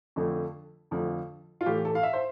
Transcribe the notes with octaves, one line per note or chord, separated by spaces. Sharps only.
F2 D3 F3 A3
F2 D3 F3 A3
F4
A2 E3 A3 G4
A4
F5
E5
C5